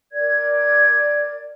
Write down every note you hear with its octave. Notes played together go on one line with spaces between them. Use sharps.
A#4 D5 G#6